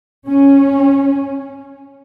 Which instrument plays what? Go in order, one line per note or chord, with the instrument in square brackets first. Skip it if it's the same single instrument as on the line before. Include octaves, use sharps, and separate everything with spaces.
[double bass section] C#4